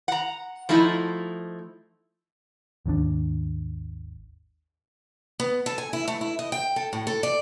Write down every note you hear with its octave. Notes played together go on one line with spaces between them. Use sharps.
F#5 A#5
F3 A3 D#4 E4
G#1 D#2 D#3 D4
B3
A4
G#5
E4
A3
E4
D#5
G5
A4
A2
A4
D5